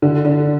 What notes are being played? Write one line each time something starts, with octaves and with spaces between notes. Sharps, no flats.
D3
D3